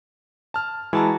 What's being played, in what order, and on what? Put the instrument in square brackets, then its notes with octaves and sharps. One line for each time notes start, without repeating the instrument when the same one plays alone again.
[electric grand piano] A5 F6
[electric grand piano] E3 G#3 E4 [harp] F#4 A5 A#5